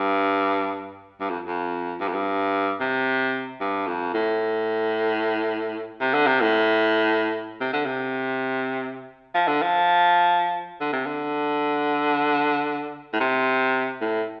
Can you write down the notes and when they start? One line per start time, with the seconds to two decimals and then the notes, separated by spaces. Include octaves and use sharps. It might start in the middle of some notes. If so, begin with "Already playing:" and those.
Already playing: G2
1.20 G2
1.29 F2
1.47 F2
2.00 G2
2.08 F2
2.14 G2
2.80 C3
3.60 G2
3.87 F2
4.14 A2
6.00 C3
6.14 D3
6.26 C3
6.41 A2
7.60 C3
7.73 D3
7.85 C3
9.34 F3
9.47 D3
9.62 F3
10.81 D3
10.93 C3
11.06 D3
13.13 A2
13.20 C3
14.01 A2